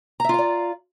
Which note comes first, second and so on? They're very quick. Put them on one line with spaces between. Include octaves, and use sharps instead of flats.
A#5 E5 F4 F5 D5